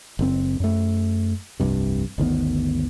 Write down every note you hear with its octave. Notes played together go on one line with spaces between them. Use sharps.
F#1 C4
F#2 A3
F1 C2 G2 C3
G1 D2 D#3 B3